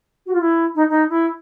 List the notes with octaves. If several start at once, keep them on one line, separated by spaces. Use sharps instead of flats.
F#4
F4
E4
D#4
D#4
E4